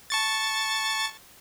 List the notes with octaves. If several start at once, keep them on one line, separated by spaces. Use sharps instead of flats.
A5 C#6 A6